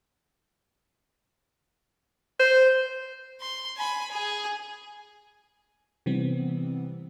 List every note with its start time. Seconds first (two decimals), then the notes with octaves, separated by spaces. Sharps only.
2.40 C5
3.41 C6
3.77 G#5 B5
4.12 G#4
6.06 C3 E3 G3 B3 C4